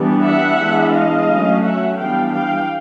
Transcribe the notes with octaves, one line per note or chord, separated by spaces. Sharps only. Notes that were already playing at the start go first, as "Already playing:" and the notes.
Already playing: E3 G3 B3 D4
E5 F#5
E3 G#3 B3 D4
D#5 F5
F#3 A3 C#4
E5 F#5
E3 G3 B3 D4 F5 G5
F5 G5